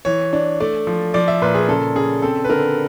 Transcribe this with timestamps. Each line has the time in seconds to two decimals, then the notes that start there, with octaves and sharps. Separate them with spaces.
0.05 E3 C#5
0.33 D4
0.60 A3 D5
0.87 F3
1.14 F3 D5
1.28 E5
1.42 A#2 B4
1.54 G#4
1.68 C#3 A4
1.95 C#3 G#4
2.22 C4 A4
2.44 B4
2.50 D3 A#4